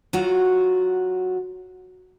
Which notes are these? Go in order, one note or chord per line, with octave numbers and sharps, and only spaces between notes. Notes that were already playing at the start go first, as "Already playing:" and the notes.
F#3 F4 F#4 A#5